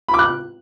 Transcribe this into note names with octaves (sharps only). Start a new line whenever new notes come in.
B5
D6
F#6